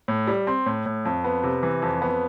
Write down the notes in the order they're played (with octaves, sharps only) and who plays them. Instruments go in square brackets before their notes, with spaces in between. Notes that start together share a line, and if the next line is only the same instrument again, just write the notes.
[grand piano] A2
G3
C4
A2
A2
F2
B3
C3
E3
F2
B3